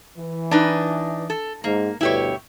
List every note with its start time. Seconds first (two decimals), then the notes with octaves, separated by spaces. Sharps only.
0.17 E3
0.51 D4 D#4 B4
1.30 A4
1.64 G#2 A#3
2.01 D2 G2 B2 E4 G4 C#5